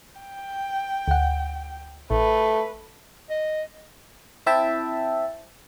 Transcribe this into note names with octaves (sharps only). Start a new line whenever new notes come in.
G5
D2 F#5
A1 A3 B4
D#5
C4 E4 E5 G5 A5